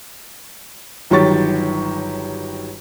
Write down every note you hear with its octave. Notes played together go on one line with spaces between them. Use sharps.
G1 D#3 F#3 G4 C#6 A6